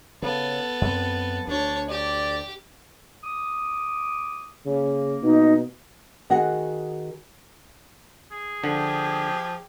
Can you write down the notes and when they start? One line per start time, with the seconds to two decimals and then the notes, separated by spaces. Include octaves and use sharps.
0.22 C#3 B3 A4
0.81 F#2 C4
1.47 D2 D4 C#5
1.89 G4 D5
3.24 D6 D#6
4.66 C#3 A#3
5.23 B2 D#4
6.30 D#3 F#4 G#4 F#5
8.31 G#4
8.64 D3 F3 G4